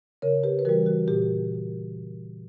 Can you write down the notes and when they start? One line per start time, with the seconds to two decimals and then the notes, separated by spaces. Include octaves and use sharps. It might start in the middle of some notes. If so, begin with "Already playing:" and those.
0.22 C#3 A#4 C#5
0.44 G4 B4
0.59 B4
0.65 E3 G3 F#4 A#4
0.86 F#4
1.08 A#2 G4